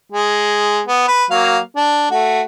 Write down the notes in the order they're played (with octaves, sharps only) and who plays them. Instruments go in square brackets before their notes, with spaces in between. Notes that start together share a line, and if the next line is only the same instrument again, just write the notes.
[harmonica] G#3
B3
B4
F#3 A#3 F5
D4
A3 F#4